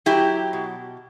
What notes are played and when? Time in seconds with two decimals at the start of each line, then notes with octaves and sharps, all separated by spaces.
0.06 F#3 E4 G4
0.53 B2